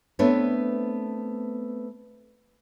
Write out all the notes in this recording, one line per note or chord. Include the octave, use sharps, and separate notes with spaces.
A3 B3 C4 D4 B4 C#5